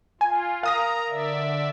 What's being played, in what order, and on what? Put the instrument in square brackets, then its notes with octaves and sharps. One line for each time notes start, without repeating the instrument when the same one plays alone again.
[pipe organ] F4 [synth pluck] G#5
[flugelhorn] A#4 [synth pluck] F5 D#6 A#6 [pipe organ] A#5
[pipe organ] D3 D5 E5